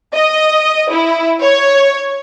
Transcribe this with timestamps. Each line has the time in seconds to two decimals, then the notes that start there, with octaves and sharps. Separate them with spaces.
0.14 D#5
0.92 E4
1.41 C#5